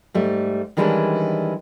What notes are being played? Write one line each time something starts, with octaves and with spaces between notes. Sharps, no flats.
G#2 G3 A3
D#3 E3 G3 G#3 C#4 D4